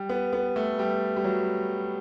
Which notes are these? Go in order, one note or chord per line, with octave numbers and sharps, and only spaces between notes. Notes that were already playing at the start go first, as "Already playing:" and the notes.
Already playing: G3
B3
B3
A3
G3
G3
F#3